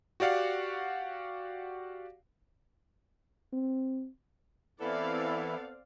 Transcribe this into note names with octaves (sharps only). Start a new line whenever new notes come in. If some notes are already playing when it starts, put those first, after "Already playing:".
F#4 G4 D5 F5 F#5
C4
E3 B3 C4 E4 A4 D5 F5